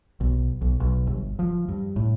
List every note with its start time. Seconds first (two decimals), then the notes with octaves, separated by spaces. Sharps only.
0.21 B1
0.62 B1
0.80 B1
1.07 G1
1.39 F3
1.69 G2
1.96 A2